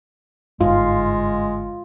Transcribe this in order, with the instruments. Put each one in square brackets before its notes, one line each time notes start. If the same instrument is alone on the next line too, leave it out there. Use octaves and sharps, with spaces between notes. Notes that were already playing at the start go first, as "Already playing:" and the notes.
[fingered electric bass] G1 G#2 [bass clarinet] G#3 [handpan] F4